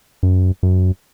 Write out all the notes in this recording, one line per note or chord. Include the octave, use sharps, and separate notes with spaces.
F#2
F#2